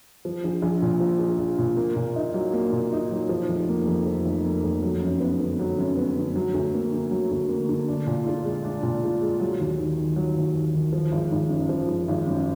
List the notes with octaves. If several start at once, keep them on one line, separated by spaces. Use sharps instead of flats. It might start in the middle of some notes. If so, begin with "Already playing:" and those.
F3
A#1
A#1
A#2
F3
A#1
A#1
A#2
A#3
A#2
D#4
F#3
A#3
A#2
D#4
F#3
F3
F1
A#3
F2
F3
F1
A#3
F2
F#3
F#2
B3
D3
F#3
F#2
B3
D3
F#3
D2
A#3
D3
F#3
D2
A#3
D3
D4
A#2
F4
G#3
D4
A#2
F4
G#3
F#3
D#2
D#2
D#3
F#3
D#2
D#2
D#3
F3
G#1
G#1
F#2
F3
G#1
G#1
F#2